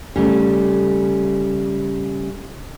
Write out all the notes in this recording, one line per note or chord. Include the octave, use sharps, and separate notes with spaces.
C#3 G3 A3